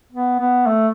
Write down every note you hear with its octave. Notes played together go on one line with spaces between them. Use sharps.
B3
B3
A3